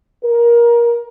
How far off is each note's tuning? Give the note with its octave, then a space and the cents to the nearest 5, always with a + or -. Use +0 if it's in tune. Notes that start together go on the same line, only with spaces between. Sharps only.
A#4 +20